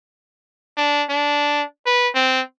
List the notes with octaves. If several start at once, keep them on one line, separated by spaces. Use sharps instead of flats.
D4
D4
B4
C4